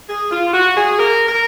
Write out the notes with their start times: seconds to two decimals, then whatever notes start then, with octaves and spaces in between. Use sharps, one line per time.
0.09 G#4
0.32 F4
0.54 F#4
0.76 G#4
0.99 A#4
1.29 A#4